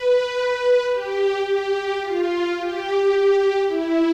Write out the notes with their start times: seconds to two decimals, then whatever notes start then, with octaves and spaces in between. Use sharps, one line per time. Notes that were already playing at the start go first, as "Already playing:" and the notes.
Already playing: B4
0.91 G4
1.47 G4
2.02 F4
2.57 G4
3.67 E4